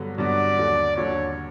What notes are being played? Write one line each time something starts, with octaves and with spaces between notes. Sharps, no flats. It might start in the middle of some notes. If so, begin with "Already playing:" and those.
Already playing: G2 D3 F#3 B3
G2 D3 F#3 B3 D5
D#2 D3 F#3
D#2 D3 F#3 C#5